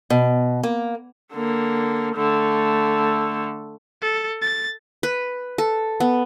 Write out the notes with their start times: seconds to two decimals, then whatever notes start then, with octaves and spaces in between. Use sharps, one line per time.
0.10 B2
0.63 A#3
1.34 D3 A#3
2.16 D3 A3
4.01 A4
4.41 A6
5.03 B4
5.58 A4
6.00 B3